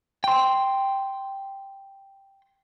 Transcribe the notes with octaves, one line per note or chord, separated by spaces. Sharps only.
G5 C6